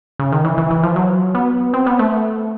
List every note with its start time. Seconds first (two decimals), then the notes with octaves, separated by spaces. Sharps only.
0.19 C#3
0.32 D#3
0.44 E3
0.58 E3
0.70 E3
0.83 F3
0.96 F#3
1.35 B3
1.74 C4
1.86 B3
1.99 A3